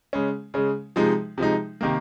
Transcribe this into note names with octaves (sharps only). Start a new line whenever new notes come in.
C#3 G#3 C#4
C#3 G#3 C#4
C3 F3 G#3 D#4
C3 F3 G#3 D#4
C3 D#3 A#3